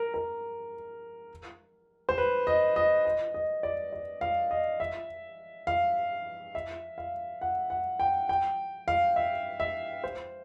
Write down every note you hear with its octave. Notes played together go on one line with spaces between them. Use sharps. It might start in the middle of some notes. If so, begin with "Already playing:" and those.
Already playing: A#4
A#4
C5
B4
D#5
D#5
D#5
D#5
D5
D5
F5
D#5
E5
F5
E5
F5
F#5
F#5
G5
G5
F5
E5
E5
C5